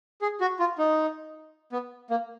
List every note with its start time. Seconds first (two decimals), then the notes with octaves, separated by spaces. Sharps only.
0.22 G#4
0.41 F#4
0.59 F4
0.78 D#4
1.72 B3
2.10 A#3